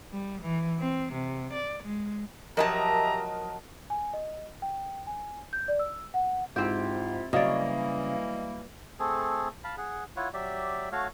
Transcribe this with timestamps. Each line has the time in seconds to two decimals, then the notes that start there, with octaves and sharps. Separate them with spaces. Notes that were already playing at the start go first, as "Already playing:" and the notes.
0.12 G3
0.41 E3
0.79 C4
1.12 C3
1.53 D5
1.83 G#3
2.57 F3 F#3 G4 A#4 D#5 E5 A5 A#5
3.90 G#5
4.13 D#5
4.62 G5
5.07 G#5
5.53 G6
5.68 D5
5.79 E6
6.14 F#5
6.56 G#2 C4 E4 F4 G4
7.33 C#3 E3 F#3 G3 A#3 D5 D#5
9.00 A3 C4 G#4 A4
9.64 F5 A5 B5
9.78 G#4 F#5
10.16 E4 F4 C#5 F#5
10.34 F#3 G4 D5 E5
10.92 A3 F#4 C#5 F5